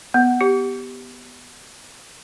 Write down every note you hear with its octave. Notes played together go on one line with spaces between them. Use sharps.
B3
G4